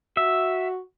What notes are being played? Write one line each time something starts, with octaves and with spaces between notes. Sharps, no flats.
F#4 E5